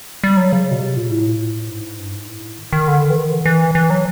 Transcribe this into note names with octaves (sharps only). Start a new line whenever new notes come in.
G3
F#3
C#3
B2
C3
A#2
A2
G#2
G2
G#2
A2
D#3
D#3
D3
E3
D#3
E3
E3
E3
F#3